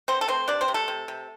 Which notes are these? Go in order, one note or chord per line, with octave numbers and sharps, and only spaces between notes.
D3 C4 C5
A4
A3 C4 C5
C3 D4 D5
C4 C5
C3
A3 A4
C3
C3